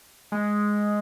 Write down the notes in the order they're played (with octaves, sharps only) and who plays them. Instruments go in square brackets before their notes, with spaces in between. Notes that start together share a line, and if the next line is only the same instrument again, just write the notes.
[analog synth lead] G#3